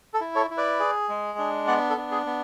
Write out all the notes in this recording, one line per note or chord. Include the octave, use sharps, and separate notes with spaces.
A4
E4
A4 C#5
E4
B4 D5
G#4
G#3
D4
B3 D5 F#5
A4
D4
G#4
B3